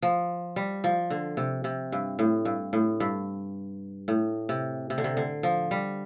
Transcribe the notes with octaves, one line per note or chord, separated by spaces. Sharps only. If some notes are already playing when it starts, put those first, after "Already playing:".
F3
G3
F3
D3
C3
C3
G2
A2
G2
A2
G2
A2
C3
C3
D3
C3
D3
F3
G3